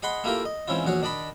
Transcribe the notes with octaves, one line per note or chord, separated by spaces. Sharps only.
G#4 D#5 F#5 B5 C6
A3 A#3 E4 F4 G4 A#4
D#5
G#2 E3 C4 C#4 E4 F4
A#1 E2 F#4 G#4 C#5
D#3 D4 D5 D#5 B5